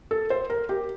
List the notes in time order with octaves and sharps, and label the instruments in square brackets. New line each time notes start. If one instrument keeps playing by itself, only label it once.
[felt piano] A4
C5
A#4
G4